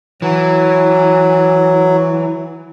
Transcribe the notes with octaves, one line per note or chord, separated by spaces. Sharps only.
E3 F#3